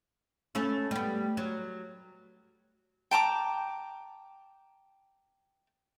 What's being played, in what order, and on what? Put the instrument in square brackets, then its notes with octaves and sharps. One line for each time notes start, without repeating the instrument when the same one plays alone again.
[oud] A3 C#4 E4
G3 B3
F#3
[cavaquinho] G5 A5 A#5 D6